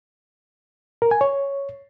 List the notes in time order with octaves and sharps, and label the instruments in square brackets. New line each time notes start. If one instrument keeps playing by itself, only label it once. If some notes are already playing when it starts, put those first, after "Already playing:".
[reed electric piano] A#4
G#5
C#5